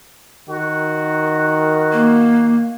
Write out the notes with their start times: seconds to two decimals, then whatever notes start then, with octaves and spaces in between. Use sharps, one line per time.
0.49 D#3 F#4
1.93 A#3